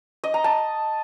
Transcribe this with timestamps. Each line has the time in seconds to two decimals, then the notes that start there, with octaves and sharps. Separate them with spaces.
0.24 D#5
0.34 A#5
0.44 A5